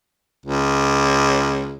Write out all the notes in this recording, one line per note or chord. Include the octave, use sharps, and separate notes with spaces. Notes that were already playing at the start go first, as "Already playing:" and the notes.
C#2